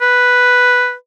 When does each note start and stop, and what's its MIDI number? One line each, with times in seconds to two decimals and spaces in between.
0.02 0.94 71